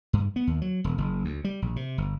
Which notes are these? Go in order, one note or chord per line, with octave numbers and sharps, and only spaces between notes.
G2
B3
D#2
F#3
E1
F#1
D2
G3
A#1
C3
G1